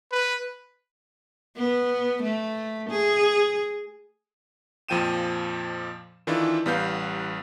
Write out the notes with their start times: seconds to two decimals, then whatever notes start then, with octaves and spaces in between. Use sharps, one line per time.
0.12 B4
1.57 B3
2.23 A3
2.90 G#4
4.89 F2 A#2 F3 G5 D#7 E7
6.27 D#3 E3 D4 E4 F4 A4
6.66 A1 G3 B3 B4 F5 G6